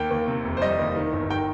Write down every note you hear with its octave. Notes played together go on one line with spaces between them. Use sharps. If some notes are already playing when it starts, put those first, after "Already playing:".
Already playing: D#2 A#3 G5
D#2
C3
F1
C5
G3 D#5
D#2
D#3
G1
D#3 G5